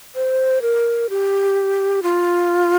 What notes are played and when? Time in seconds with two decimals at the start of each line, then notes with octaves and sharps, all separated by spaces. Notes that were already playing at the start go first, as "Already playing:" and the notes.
0.15 C5
0.62 A#4
1.09 G4
2.03 F4